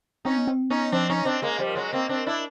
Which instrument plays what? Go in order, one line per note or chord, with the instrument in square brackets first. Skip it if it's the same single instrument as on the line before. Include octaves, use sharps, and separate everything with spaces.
[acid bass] C4 [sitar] C#4 D#4
[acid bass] B3
C4
[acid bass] B3 [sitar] C#4 D#4
[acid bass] F3 [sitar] C4 D4
[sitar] C#4 D#4
C4 D4
G#3 A#3
F3 G3
F#3 G#3
A#3 C4
C4 D4
D4 E4